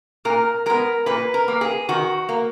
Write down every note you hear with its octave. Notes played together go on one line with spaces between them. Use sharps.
A#2 A#4
G#3 B3 A#4
A#2 B4
A#4
A#3
G#4
D#3 F#4
A#3